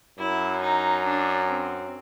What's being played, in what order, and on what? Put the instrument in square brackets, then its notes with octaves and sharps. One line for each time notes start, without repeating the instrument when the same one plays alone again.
[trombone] F#2 [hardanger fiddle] E4
[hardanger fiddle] D#4
D4
C4